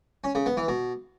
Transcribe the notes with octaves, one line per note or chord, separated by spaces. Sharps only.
C#4
C#3
B3
E3
B2